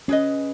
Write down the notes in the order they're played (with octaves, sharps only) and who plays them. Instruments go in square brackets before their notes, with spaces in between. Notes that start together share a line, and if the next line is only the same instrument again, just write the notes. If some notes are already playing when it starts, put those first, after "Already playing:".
[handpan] C#4 [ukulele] G#4 B4 D#5